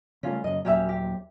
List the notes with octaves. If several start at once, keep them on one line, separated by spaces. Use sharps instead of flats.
C#3 G3 A3 C#4 F4
F#2 C#3 D#5
D#2 A#2 F#3 C#4 G4 E5
G4